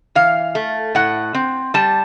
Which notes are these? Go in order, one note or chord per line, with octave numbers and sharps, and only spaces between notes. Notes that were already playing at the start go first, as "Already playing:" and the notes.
E3 F5
A3
A2 F#5
C4
G3 A5